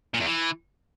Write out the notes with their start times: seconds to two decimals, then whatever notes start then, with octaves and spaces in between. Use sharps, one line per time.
0.14 A#2
0.20 E2
0.26 E3